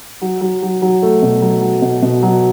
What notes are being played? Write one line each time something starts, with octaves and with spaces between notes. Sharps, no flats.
F#3
F#3
F#3
F#3
A3
B2
F#3
F#3
B2
B2
F#3